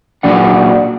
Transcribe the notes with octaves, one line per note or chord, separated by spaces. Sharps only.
A#2 F#3 D4 F#5